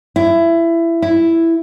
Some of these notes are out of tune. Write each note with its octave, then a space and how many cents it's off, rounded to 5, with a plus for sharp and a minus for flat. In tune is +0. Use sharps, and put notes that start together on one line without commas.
E4 +20
E4 +5